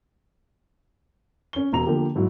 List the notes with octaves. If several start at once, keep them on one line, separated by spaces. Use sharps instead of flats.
C#4 G7
E1 A#5 F7
D3 F3 A#3 G4
G#2 F#3 E4 F#4